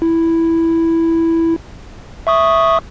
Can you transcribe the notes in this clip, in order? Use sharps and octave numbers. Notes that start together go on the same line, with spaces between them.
E4
E5 C#6 D#6